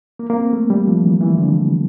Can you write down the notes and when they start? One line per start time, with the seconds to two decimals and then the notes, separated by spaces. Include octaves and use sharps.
0.19 A#3
0.30 A#3
0.36 C4
0.53 A3
0.70 G3
0.87 F3
1.04 E3
1.21 E3
1.38 D3